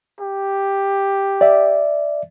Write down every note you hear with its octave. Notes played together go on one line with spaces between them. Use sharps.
G4
D5 E5